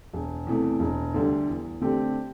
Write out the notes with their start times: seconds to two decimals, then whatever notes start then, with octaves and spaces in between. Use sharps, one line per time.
0.14 E1
0.47 E2 C3 E3 A3
0.80 E1
1.14 D2 D3 G3
1.48 E2
1.81 D3 A3 C4 G4